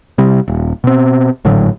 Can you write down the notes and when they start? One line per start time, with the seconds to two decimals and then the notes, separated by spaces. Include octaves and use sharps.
0.18 C3 G3
0.48 D#1
0.84 B2 C4
1.45 G#1 A2 D3 F#3